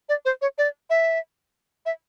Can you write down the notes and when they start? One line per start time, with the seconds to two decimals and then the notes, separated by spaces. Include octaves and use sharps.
0.09 D5
0.25 C5
0.42 C#5
0.58 D5
0.90 E5
1.86 E5